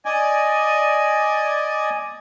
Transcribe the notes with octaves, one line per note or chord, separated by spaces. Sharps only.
D5 D#5 G#5